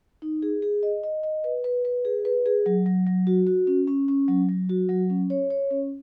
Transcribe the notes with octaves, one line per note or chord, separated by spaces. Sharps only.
D#4
G#4
G#4
D#5
D#5
D#5
B4
B4
B4
G#4
B4
G#4
F#3
F#3
F#3
F#4
F#4
C#4
C#4
C#4
F#3
F#3
F#4
F#3
C#4
C#5
C#5
C#4